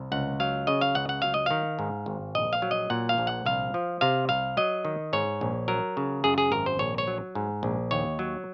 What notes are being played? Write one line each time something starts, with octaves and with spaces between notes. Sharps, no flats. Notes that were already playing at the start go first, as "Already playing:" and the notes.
Already playing: C2
C#2 F#5
F#3 F5
C#3 D#5
F5
C#2 F#5
F#5
F#3 F5
D#5
D#3 F5
G#2
G#1
A#1 D#5
F5
F#3
D#5
A#2 F#5
F5
A#1
F#5
C2 F5
F3
C3 F5
C2 F5
F#3 D#5
D#3
G#2 C#5
A#1
F#3 A#4
C#3
F#2 G#4
G#4
G#1 A#4
C5
A#1 C#5
C#5
F#3
G#2
A#1
D#2 C#5
F#3